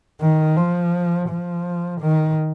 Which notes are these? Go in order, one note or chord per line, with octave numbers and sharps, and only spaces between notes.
D#3
F3
F3
D#3